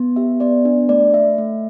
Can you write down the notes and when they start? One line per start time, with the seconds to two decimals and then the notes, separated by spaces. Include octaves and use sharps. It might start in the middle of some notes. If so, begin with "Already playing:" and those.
Already playing: B3
0.16 G4 E5
0.40 B3 D5
0.65 D4
0.89 A3 D5
1.14 A3 E5
1.38 A3